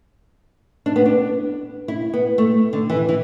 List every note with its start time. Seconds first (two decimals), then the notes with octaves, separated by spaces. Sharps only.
0.86 D4
0.96 B3
1.06 D4
1.88 E4
2.13 B3
2.38 A3
2.73 D3
2.90 E3
3.09 E3